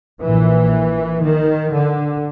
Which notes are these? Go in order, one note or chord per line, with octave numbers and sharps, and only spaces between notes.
A#1 A#2 E3
D#3
D3